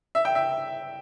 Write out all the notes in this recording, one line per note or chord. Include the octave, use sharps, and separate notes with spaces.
E5
G5
E5